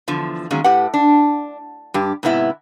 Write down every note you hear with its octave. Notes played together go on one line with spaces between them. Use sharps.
E2 D3 F3
D#3 F#3 G#3 A#3 C#4
A2 G4 B4 F#5
D4
G2 G4
G#2 C3 B3 E4 E5